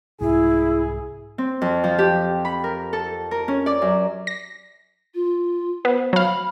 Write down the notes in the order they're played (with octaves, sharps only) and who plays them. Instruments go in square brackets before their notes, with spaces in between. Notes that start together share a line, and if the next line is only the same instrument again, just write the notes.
[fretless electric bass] C2 G#2 [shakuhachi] E4 [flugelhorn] G#4
[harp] C4
F2
F3
G4
B5
A#4
A4
A#4
C#4
D5
F#2
[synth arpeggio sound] A#6
[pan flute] F4
[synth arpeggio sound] B3 [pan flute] C5
[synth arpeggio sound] F#3 F5 [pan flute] B5